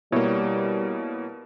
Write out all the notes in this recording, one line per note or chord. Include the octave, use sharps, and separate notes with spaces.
B2 G3 A#3 E4 C#5